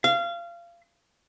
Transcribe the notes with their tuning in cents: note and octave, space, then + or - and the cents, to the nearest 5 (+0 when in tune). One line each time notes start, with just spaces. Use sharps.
F5 -25